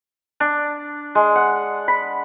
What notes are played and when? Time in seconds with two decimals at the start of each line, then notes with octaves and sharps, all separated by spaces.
0.40 D4
1.15 G#3
1.35 F#5
1.88 B5